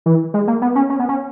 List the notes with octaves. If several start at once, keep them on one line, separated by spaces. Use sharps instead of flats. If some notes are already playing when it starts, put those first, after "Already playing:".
E3
G#3
A#3
B3
C#4
C#4
B3
C#4